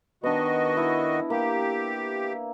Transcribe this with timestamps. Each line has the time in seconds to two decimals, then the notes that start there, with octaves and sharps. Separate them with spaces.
0.24 D#3 B3 D4 F#4 D#5
0.77 E4
1.30 A#3 G4